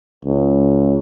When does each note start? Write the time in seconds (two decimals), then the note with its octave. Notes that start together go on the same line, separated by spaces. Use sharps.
0.25 C#2